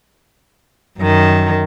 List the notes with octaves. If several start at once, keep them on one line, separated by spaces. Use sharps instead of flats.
F#2 D#3